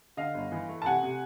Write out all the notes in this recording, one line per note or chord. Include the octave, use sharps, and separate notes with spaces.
D3 D#5 F5
G1
E3
A3
A5
C3 F#5 G#5
C3